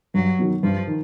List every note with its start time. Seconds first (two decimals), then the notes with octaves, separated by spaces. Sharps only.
0.14 G2 F#3
0.39 D#3 F#3 B3
0.63 G2 F3
0.87 D#3